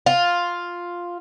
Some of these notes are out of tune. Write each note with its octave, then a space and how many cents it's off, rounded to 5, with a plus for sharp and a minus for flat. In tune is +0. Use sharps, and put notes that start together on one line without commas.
F4 +5